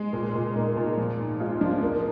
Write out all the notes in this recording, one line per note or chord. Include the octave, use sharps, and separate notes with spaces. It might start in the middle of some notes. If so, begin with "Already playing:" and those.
Already playing: G#3
A#2
A#2
A#3 D#4
A#2
F3
G#2
G#3 F4
F3 D4
A#3 D#4